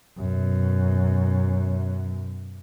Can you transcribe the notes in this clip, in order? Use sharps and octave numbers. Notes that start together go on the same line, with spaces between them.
F#2 B2